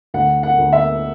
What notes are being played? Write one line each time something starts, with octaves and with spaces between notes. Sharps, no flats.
D2 F#5
F#5
D2
E5